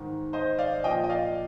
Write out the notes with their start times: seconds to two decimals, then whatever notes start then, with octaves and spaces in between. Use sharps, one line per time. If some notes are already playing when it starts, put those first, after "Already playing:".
Already playing: G#2 D#3
0.33 C5 D#5
0.58 D5 F5
0.84 A#2 F3 D#5 G5
1.04 D#5
1.10 D5 F5